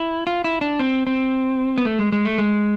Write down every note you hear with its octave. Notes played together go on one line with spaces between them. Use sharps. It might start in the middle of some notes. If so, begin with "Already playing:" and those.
Already playing: E4
F4
E4
D4
C4
C4
B3
A3
G#3
G#3
A3
G#3